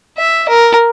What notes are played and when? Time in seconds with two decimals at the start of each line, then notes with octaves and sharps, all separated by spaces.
0.18 E5
0.49 A#4